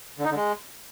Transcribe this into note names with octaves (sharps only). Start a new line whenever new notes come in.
D3
D#4
D3
G#3